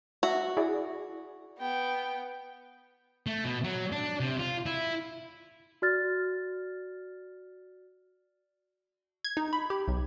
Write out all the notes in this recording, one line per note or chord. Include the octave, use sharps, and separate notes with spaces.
F#4 E5
E4 G#4 D5
B3 G5
A3
B2
F#3
D4
C3
F4
E4
F#4 D5 F6 A6
G#6
D#4
B5
G4
B1